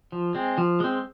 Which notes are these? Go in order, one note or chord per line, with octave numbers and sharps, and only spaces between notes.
F3
G#3 C4
F3
G#3 C4